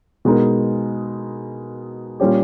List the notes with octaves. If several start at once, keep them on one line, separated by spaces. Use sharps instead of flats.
B2 G#3 D#4 A#4
A#2 G3 C#4 G4